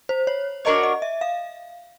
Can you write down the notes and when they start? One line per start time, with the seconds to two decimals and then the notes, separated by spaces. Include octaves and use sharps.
0.09 C5
0.27 C#5
0.65 D4 F#4 A#4 C#5 D#5
0.83 D#5
1.02 E5
1.21 F5